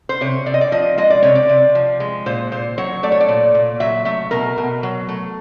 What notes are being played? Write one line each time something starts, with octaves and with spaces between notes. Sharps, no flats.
C5
C3 C#5
C3 D5
D#5
D5
F3 D#5
G#3 D#5
D5
C3 C#5
D5
C3
F3
G#3
A#2 C5
A#2 C5
F#3 C#5
A3 D5
C#5
D5
A#2
A#2
F#3 E5
A3 E5
B2 A#4
B2
F#3
A3